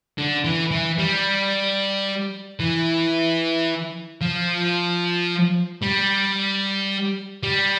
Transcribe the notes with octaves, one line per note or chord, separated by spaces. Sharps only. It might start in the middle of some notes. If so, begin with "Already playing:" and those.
D3
E3
E3
G3
E3
F3
G3
G3